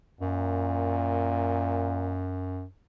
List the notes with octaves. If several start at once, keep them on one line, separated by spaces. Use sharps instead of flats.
F#2 A#2